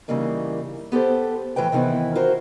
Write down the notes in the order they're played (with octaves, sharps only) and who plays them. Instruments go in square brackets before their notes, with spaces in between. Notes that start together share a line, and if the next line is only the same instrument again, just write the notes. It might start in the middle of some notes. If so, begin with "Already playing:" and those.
[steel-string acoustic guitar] C#3 E3 G3 A#3 D#4
B3 G4 A4 C5
A2 E3 F3 B4 G5
C3 D#3 E3 B3 E4
F4 F#4 A#4 C5